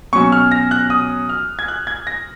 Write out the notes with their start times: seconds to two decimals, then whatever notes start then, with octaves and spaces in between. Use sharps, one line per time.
0.13 B2 F#3 C#4 C#6
0.32 F6
0.51 A#6
0.71 F#6
0.90 D#6
1.29 F6
1.59 G#6
1.68 F#6
1.87 G#6
2.07 A#6